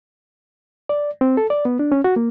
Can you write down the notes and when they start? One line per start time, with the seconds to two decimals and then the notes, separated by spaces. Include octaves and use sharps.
0.89 D5
1.21 C4
1.37 A4
1.50 D5
1.65 B3
1.79 D4
1.92 C#4
2.04 F#4
2.16 A#3